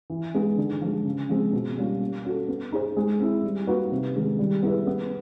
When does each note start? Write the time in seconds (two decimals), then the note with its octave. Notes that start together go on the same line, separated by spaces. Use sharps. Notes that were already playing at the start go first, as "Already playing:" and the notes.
0.10 E3
0.35 G#3 B3 D#4
0.57 D3
0.81 F3 G#3
1.05 C#3
1.29 F3 G#3 C4
1.53 B2
1.77 G3 A#3 C#4 F4
2.01 A#3
2.25 C#4 F#4 A4
2.48 B3
2.72 D#4 G#4 C5
2.97 G#3
3.20 C4 E4
3.44 G3
3.67 A#3 D#4 F#4 B4
3.92 C3
4.15 D#3 G#3 C#4
4.39 G3
4.63 B3 E4 G#4 B4
4.87 B3